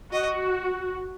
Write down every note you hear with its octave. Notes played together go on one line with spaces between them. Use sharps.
F#4 D#5